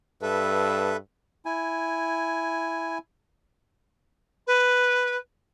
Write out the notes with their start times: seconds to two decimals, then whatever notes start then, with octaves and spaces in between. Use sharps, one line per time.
0.22 G2 A4 B4 E5
1.46 E4 G#5
4.47 B4